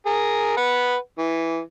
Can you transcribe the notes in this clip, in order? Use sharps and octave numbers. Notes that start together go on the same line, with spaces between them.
G#4 A#4
B4 F#5
E3